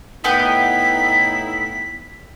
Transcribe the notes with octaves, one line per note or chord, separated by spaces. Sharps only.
A2 B3 D#4 E4 G5 D#6 B6